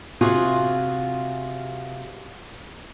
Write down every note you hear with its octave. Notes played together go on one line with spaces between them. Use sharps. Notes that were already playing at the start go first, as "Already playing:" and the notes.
C3 F4 F#4 G#4